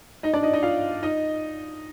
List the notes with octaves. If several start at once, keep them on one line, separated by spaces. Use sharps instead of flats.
D#4 D#5
D4 D5
D#4 D#5
D#4 D#5
F4 F5
D#4 D#5